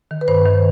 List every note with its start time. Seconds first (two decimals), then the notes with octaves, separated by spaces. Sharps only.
0.11 D#3
0.21 B4
0.28 G2 C5
0.46 D#3